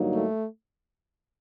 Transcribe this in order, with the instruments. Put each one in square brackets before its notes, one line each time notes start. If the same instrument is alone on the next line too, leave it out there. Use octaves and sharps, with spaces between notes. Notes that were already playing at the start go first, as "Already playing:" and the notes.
Already playing: [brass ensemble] G2 D3 F#3 A#3 D#4
[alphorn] A3